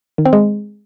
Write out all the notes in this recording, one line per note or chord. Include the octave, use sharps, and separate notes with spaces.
D#3
C4
G#3